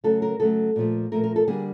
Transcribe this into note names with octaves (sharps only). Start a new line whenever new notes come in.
C#3 F#3 A3 A4
A#4
C#3 F#3 A3 A4
A#2 F3 A3
A#2 F3 A3 A#4
A#4
A4
D3 G3 A#3 G#4